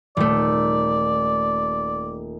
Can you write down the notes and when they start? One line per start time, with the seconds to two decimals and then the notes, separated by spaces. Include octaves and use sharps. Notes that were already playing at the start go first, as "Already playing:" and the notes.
0.17 D#1 A3 D5